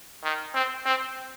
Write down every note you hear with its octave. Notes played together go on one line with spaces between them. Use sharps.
D#3
C4
C4